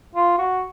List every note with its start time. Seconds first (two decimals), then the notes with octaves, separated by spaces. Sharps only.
0.16 F4
0.39 F#4